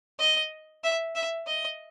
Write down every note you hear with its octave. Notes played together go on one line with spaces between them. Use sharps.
D#5
E5
E5
D#5